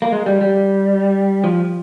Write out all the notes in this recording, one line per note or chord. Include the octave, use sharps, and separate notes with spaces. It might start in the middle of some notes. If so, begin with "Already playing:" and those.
A#3
G#3
G3
G3
F3